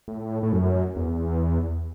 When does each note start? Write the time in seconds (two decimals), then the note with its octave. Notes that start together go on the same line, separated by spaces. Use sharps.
0.08 A2
0.43 A2
0.52 F#2
0.96 E2